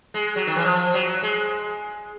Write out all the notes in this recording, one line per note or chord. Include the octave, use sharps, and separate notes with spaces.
G#3
F#3
D#3
E3
F3
F#3
G#3